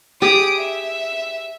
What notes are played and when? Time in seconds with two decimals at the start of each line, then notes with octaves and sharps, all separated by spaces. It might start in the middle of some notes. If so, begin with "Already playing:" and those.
0.22 G4 G#4 D#6 D7
0.58 E5